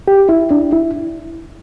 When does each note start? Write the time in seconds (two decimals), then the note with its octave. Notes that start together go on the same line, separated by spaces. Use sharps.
0.08 G4
0.29 E4
0.51 D4
0.72 E4